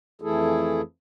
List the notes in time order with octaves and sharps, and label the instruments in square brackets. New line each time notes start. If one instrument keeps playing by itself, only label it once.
[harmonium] F2 E3 A3 E4 G#4 A4